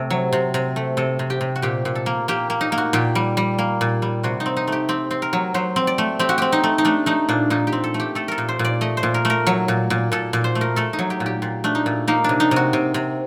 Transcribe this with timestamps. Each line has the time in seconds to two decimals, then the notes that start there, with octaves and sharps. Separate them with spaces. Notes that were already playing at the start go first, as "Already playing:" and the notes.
Already playing: C3 A3
0.10 F#3
0.33 C3
0.54 C3
0.76 A3
0.97 C3 A4
1.19 C3
1.30 G4
1.41 C3
1.56 F#4
1.62 A#2 G4
1.85 A#2
1.95 A4
2.06 A#3
2.28 A#3 G4
2.50 A#3
2.61 D#4
2.72 A#3
2.78 F#4
2.93 A#2 G4
3.15 G3
3.37 G3
3.59 A#3
3.81 A#2
4.02 G3
4.23 C3 F#4
4.40 D#4
4.46 C4
4.57 D#4
4.67 A3 G4
4.89 C4 G4
5.11 C4
5.22 A#4
5.33 F#3
5.54 F#3 C5
5.76 C4
5.87 D5
5.98 A3
6.19 C4 G4
6.29 F#4
6.38 C4 G4
6.52 D#4
6.64 A3
6.78 D#4
6.85 A3 D4
7.06 A3 D#4
7.29 A#2 D4
7.50 A#2 D#4
7.67 G4
7.72 C4
7.84 A4
7.94 A3
8.00 G4
8.15 A3 A4
8.28 A4 A#4
8.38 A#2
8.49 C5
8.59 A#2
8.64 D5
8.81 A3 D#5
8.97 C5
9.03 A#2
9.14 A#4
9.25 A3
9.30 A#4
9.47 F#3
9.68 A#2
9.90 A#2
10.12 A#2 A4
10.33 A#2
10.44 C5
10.55 A3
10.61 A#4
10.76 A3 A4
10.93 D#4
10.99 F#3
11.10 G4
11.20 A#2
11.26 G4
11.42 A#2
11.64 A3 D4
11.75 D#4
11.86 A#2
12.08 A#3 D#4
12.24 C3 D4
12.40 D#4
12.51 C3
12.56 F#4
12.73 C3
12.94 C3